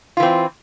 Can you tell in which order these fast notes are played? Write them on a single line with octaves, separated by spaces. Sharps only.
F4 E3 C4